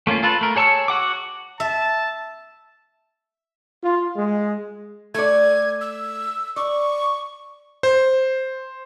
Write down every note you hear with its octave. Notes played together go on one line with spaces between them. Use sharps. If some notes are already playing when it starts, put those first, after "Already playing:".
A3 A#3 C#4 F4
F4 A4 B4
A3 A#4
G#4 C#5 A5 C#6 E6
F#4 F#5 D6
E5 A5
F4
G#3
A3 D5 G#6
E6
D5 C#6
C5